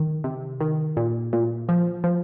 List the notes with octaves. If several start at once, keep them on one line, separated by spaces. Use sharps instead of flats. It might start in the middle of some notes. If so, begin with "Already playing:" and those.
Already playing: D#3
C3
D#3
A#2
A#2
F3
F3